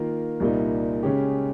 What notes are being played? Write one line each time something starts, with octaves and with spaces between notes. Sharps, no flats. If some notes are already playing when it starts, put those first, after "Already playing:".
Already playing: D#3 A#3 F4 A#4
C2 A#2 G3 A#3 D#4
C#3 G#3 C#4 G4